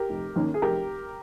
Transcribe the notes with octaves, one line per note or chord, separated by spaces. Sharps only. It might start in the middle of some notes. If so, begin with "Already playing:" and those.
Already playing: G4 A#4
F1
D#2 D#3 A#3 C#4
G#4
F1 G4 A#4